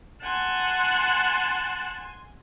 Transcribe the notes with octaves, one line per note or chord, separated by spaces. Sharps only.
F#5 G#5 A5 C6